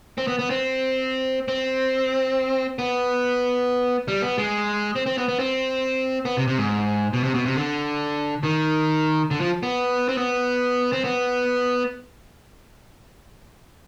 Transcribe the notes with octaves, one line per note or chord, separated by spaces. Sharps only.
C4
B3
B3
C4
C4
B3
G3
B3
G#3
C4
C4
B3
B3
C4
B3
C3
C3
G#2
B2
C3
B2
C3
D3
D#3
D3
F3
B3
C4
B3
C4
B3